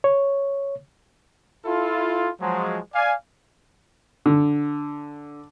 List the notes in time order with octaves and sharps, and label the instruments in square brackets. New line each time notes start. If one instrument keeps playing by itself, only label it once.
[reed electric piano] C#5
[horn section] E4 F4 A4
F3 F#3 G#3
D5 F5 G#5
[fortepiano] D3